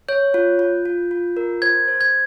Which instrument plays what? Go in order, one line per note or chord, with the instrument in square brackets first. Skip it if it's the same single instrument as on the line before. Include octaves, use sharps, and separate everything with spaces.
[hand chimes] C#5 [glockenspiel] G6
[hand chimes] F4
F4
F4
F4
A#4
[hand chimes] C5 [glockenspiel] G#6
[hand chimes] C5
[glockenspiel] G#6